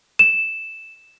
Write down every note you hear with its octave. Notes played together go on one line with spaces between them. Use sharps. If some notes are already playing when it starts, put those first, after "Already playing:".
E7